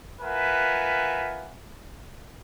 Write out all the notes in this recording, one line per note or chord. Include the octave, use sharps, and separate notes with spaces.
F4 A#4 B4 E5 F#5 G#5